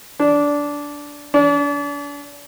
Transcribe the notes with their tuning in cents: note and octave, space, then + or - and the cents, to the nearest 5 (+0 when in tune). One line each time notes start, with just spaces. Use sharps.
D4 -15
D4 -40